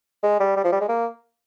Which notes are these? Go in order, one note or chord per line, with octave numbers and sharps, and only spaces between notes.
G#3
G3
G3
F3
G3
G#3
A#3